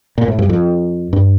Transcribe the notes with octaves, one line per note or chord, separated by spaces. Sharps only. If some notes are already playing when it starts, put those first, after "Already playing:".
A#2
A2
G2
F2
G2